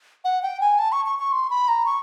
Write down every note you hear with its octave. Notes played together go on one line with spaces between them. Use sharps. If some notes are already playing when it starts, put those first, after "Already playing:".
F#5
G5
G#5
A5
C#6
C#6
C#6
C6
B5
A#5
C#6